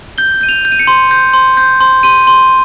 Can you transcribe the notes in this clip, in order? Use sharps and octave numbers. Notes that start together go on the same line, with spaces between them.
G6 G7
G6 D#7
F7
G6
D#7
C#7
C6
G6
C6
G6
C6
C6 D#7
C6